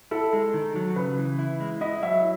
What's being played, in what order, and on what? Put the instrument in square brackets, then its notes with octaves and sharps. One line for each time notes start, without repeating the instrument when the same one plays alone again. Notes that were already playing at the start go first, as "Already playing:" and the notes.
[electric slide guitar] E4 [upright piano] A4
[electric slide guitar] G#3
D#3
F#3
[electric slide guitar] C#3 [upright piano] B4
[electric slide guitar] E3
E4
G#3
[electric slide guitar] E4 [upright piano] D#5
[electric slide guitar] F#3 [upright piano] E5